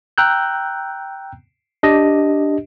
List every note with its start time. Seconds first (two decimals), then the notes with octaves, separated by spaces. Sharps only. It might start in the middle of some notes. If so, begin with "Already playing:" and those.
0.18 G5 A#5 E6 F#6 G6
1.83 D4 G4 D#5